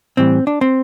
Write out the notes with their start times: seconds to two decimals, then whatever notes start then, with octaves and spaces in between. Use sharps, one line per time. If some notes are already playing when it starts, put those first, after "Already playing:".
0.17 A2 E3 G3 C4
0.47 D4
0.61 C4